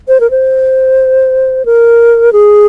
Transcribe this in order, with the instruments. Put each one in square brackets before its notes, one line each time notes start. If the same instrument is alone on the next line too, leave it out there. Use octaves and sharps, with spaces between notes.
[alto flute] C5
A#4
C5
A#4
G#4